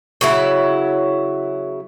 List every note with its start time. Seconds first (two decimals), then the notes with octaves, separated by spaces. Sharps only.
0.21 C#3 F#3 E4